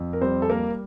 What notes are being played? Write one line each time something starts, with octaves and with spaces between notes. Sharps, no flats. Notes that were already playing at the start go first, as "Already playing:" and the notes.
Already playing: F2
A#4
G3 C4 C5
A4
G3 A#3 A#4